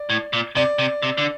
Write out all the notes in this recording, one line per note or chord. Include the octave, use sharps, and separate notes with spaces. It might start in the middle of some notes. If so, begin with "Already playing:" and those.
Already playing: D5
A2
A#2
C3 D5
C3
C3
D3